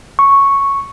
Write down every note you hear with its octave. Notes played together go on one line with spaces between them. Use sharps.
C#6